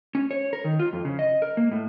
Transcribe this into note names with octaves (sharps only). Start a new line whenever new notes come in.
C#4
C#5
A#4
D#3
F4
F2
C#3
D#5
A#4
A#3
A2